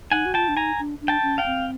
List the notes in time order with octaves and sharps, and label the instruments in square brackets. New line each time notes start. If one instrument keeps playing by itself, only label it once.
[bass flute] D#4 [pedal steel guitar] F#5 G#5
[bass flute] F#4
[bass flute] F4 [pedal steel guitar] G5 A5
[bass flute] D4
[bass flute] D#4 [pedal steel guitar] G#5 A#5
[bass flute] D4
D4
[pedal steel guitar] G5 A5
[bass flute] C#4
[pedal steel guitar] F5 G5
[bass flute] C4